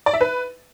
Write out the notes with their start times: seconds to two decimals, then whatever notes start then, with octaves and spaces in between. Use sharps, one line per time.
0.06 D5
0.13 E5
0.21 B4